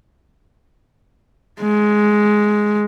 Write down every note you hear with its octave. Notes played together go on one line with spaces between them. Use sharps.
G#3